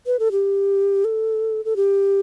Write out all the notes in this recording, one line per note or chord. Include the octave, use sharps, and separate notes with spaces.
B4
A4
G4
A4
A4
G4